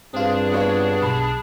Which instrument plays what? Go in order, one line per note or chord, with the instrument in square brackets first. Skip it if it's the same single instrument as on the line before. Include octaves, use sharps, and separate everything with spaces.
[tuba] G2 [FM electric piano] C4 F4 [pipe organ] D4 G#4
[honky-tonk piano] B3 F#4 C#5
[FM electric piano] B1 [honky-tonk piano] A5 B5 C7